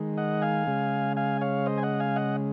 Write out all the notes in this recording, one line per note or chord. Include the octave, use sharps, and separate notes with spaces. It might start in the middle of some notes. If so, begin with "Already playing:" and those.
Already playing: D#3 G#3
D#5 F#5
F5 G#5
C#3 G#3
F5 G#5
C#5 F5
C5 D#5
G#5
D#5 F#5
F5 G#5
D#5 F#5